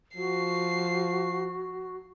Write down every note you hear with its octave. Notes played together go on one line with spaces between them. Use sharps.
F3 F#4 C7